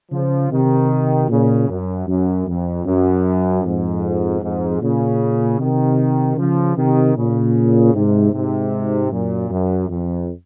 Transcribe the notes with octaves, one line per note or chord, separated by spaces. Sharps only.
C#3 F3
C3 D#3
A#2 C#3
F#2
F#2
F2
F#2
F2 G#2
F2 G#2
A#2 C#3
C3 D#3
C#3 F3
C3 D#3
A#2 C#3
G#2 C3
G#2 C3
F#2 A#2
F#2
F2